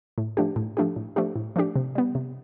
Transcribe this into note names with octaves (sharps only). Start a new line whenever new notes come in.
A2
F3 A3 D4 G4
A2
F3 A3 D4 G4
A2
F3 A3 D4 G4
A2
F3 A3 D4 G4
C3
G3 B3
C3